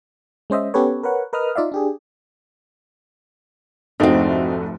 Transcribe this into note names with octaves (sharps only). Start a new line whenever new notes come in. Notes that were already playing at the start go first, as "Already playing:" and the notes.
G#3 C#4 C5 D#5 E5
B3 C#4 G4 A4 B4 C#5
A#4 B4 C#5 F#5
A#4 B4 D#5 D#6 F6
D#4 F4 D5 E5 F5
D4 G4 G#4
F1 G#2 F3 A3 C4 D4 D#4 F#4